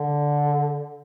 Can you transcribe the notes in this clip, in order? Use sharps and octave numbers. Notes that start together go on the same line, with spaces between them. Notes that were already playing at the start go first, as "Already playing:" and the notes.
Already playing: D3